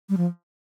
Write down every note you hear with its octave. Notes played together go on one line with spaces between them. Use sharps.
G3
F3